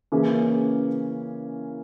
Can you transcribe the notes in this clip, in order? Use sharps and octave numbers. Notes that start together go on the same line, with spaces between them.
C#3 E3 A#3 C#4 G#4